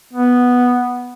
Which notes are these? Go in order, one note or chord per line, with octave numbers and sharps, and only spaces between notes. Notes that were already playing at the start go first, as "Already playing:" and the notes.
B3